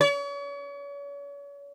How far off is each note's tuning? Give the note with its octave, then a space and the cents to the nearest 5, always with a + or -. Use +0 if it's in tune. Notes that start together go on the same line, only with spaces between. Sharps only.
C#5 +40